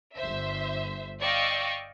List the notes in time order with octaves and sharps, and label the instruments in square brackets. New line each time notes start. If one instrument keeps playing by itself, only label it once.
[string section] G1 C5 E5
D5 D#5 F5 G5 C#6 E6